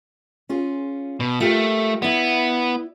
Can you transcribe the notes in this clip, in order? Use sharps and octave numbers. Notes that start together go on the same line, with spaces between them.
C#4 F4 G#4
B2
A3 F4 G4 A#4
B3 E4 D5